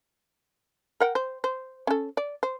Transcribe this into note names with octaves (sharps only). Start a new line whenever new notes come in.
A#4 F#5 G5
C5
C5
C#4 A4
D5
C5